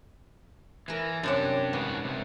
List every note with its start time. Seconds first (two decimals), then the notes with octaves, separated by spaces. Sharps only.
0.88 E3 A#4 B5
1.23 F#2 C3 D4 G4 F#5
1.73 G#2 G3 B3 F#4
2.04 C3 G3